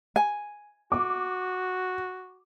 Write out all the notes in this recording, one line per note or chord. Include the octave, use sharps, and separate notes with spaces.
G#5
F#4 D6